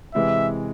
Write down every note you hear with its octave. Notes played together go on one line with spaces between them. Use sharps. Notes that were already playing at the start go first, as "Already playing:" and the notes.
C3 E3 G#3 E5